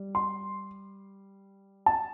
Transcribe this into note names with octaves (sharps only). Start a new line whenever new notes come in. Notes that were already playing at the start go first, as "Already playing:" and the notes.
Already playing: G3
C6
A5